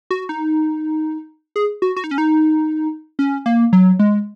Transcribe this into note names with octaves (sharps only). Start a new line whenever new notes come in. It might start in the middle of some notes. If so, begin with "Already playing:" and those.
F#4
D#4
G#4
F#4
F#4
D#4
C#4
D#4
C#4
A#3
F#3
G#3